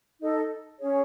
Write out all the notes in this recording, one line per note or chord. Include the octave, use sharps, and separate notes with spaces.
D#4 A4 D#5
C#4 G#4 C#5